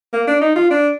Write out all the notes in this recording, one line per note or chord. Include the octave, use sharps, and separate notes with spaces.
A#3
D4
D#4
F4
D4